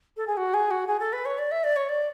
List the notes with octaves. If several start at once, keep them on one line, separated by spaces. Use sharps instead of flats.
A4
G#4
F#4
G#4
F#4
G#4
A4
B4
C#5
D5
E5
D5
C#5
D5